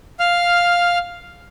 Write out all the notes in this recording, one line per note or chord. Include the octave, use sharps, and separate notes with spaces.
F5 F6